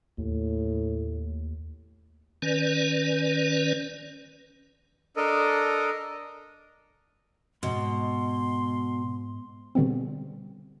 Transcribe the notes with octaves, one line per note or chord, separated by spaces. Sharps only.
D#2 A2
D#3 C#4 B4 D5
D4 A4 A#4 D#5
G#2 B2 D#5 C6
B2 D3 G3 B3 C4